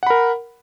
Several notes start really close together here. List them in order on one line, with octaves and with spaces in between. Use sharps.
F#5 B5 A#4